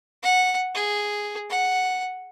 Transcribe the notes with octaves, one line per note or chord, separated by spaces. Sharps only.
F#5
G#4
F#5